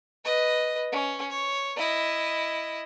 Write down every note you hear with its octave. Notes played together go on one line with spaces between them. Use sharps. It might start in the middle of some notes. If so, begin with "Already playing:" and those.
B4 D#5
C#4
C#5
E4 D#5